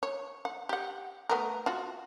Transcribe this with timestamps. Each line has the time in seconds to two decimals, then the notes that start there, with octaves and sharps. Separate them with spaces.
0.03 C#5
0.45 F#5
0.69 G4 F#5
1.29 A3 B3 A#4
1.66 F4 F#4